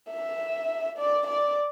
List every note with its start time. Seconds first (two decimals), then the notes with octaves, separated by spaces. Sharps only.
0.11 E5
0.98 D5
1.27 D5